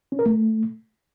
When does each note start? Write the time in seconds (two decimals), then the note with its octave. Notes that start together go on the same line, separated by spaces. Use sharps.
0.12 C#4
0.19 A#4
0.26 A3